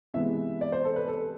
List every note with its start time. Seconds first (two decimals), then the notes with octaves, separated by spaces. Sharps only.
0.14 C3 E3 G#3 B3 E5
0.61 D5
0.72 C5
0.84 A4
0.96 B4
1.08 A4